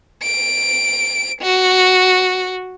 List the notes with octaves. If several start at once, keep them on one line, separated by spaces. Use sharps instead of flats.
D7
F#4